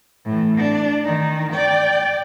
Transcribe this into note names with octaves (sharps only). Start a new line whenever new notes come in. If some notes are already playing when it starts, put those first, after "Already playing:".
A2 E3
D4
D#3 D#4
D5 G5